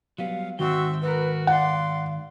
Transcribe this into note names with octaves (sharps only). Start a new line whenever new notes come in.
F#3 G3 B3 F5
G#2 D#3 C4 F#4 E5 G5
F#4 A#4 B4
D5 F5 F#5 C6